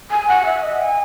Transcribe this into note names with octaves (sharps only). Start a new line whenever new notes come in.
G#5
F#5
E5
D#5
G#5